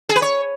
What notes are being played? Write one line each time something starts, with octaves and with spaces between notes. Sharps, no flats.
G#4
B4
C#5